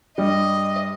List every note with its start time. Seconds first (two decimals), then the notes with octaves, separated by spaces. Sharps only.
0.18 G2 G3 D#5